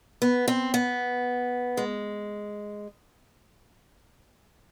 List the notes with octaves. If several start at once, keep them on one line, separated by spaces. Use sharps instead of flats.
B3
C4
B3
G#3